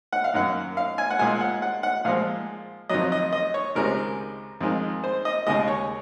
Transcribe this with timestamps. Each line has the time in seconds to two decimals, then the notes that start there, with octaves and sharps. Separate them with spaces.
0.13 F#5
0.24 F5
0.34 F#2 D#3 A#3 F#5
0.77 F5
0.98 G#5
1.10 F#5
1.19 A#2 G#3 G#5
1.41 F#5
1.62 F#5
1.83 F#5
2.05 A#2 F3 G#3 F5
2.89 F2 D#3 F#3 D#5
3.12 D#5
3.33 D#5
3.54 C#5
3.75 C#2 C3 D#3 G#3 A#4
4.61 F2 D#3 G#3
5.04 C5
5.25 D#5
5.47 D#2 C#3 G#3 D#5
5.68 C#5